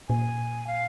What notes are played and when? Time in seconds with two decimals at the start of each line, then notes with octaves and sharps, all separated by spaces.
0.09 A#2 G#5
0.67 F5